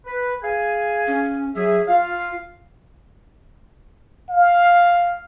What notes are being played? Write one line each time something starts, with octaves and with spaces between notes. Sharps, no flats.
B4
G#4 F5 G#5
C#4
F#3 G#4 E5
F4 F5
F5